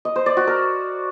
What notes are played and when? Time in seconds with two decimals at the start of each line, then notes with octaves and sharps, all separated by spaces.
0.05 D#5
0.16 C5
0.26 D5
0.37 F#4
0.47 A#4